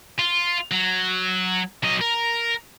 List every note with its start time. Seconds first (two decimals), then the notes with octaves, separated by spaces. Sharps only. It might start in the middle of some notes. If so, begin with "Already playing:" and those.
0.19 F4
0.71 F#3
1.84 F#3 D#5
2.01 A#4